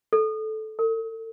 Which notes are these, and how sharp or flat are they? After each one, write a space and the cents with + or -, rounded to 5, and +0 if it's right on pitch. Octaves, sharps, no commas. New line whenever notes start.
A4 -15
A4 +40